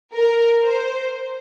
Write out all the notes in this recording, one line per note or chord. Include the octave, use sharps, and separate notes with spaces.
A#4
C5